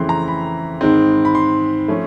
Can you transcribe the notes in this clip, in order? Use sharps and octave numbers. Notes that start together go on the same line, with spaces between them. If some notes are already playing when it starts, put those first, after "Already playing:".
Already playing: F2 C#3 E3 A3 C4 C6
A#5
B5
G#2 D#3 G#3 C4
B5
C6
F3 A3 C#4